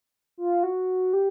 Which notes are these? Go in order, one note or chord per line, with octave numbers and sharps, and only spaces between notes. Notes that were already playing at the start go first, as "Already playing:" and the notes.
F4
F#4
G4